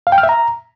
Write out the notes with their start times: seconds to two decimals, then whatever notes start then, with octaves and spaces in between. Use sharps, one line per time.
0.07 F5
0.12 G5
0.18 F6
0.23 E5
0.29 A#5